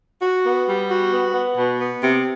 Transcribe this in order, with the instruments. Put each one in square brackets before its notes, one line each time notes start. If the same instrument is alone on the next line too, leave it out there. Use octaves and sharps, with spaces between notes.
[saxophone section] F#4
B3
G3
F#4
B3
B3
B2
B3
C3